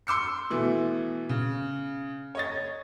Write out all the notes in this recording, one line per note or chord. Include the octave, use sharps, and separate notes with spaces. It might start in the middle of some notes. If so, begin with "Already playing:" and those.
C6 D6 E6 C#7
B2 E3 A3 B3
C#3
C#5 D#5 A6